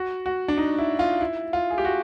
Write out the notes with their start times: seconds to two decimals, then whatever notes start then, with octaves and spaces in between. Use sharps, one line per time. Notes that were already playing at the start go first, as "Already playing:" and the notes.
Already playing: F#4
0.26 F#4
0.48 D4
0.57 D#4
0.78 E4
0.99 F4
1.21 E4
1.53 F4
1.70 G#4
1.78 G4
1.85 F#4